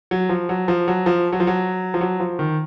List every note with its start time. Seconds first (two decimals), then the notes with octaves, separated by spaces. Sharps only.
0.11 F#3
0.29 F3
0.49 F#3
0.68 F3
0.88 F#3
1.06 F3
1.32 F#3
1.40 F3
1.47 F#3
1.94 F3
2.01 F#3
2.20 F3
2.39 D#3